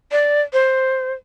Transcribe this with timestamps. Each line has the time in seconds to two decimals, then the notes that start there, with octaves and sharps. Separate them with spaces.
0.12 D5
0.53 C5